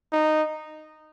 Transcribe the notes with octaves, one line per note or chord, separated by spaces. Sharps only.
D#4